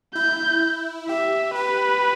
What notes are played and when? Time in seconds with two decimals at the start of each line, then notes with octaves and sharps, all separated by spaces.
0.15 E4 G6
1.08 G4 E5
1.55 G4 B4